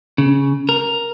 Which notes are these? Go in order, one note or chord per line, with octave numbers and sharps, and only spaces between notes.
C#3
A#4